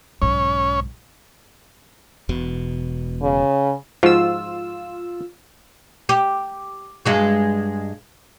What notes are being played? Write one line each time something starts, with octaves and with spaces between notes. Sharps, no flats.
B1 G#2 C#4 C#5
E1 B2
C#3
G#2 F3 F4 F#4 E6
G4
G2 G#3 F#4